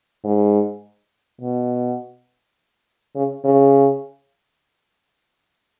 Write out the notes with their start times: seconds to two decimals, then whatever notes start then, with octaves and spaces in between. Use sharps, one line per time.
0.25 G#2
1.41 B2
3.16 C#3
3.45 C#3